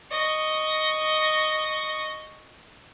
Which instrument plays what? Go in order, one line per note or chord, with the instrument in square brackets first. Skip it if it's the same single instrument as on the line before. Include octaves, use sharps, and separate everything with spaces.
[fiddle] D#5 C#6